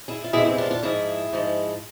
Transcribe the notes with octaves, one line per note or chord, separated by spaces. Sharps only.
E4 G#4
F4
E2 C3 E3 G#3 E4 G#4
C4 E4
D4 F4
D4 F4
G#2 F3 G#3 E4 G#4
G#2 F3 G#3